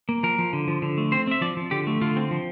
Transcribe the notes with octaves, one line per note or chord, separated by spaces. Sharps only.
A#3
F3 A#4
F3
D3
F3
D3
A3
C4 C5
C4 E5
F3 D5
F3
D3 G4
A3
D3 F4
C4
F3